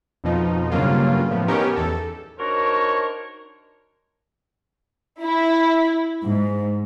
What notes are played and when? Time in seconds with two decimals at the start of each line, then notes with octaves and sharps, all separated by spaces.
0.24 F2 B2 F3 D#4
0.72 G2 C#3 F#3 A#3 F4
1.31 A2 F3 B3
1.48 B3 C#4 D#4 G4 A#4 C#5
1.76 E2 A4
2.39 D4 D#4 F#4 A#4 C5 C#5
5.22 E4
6.25 G#2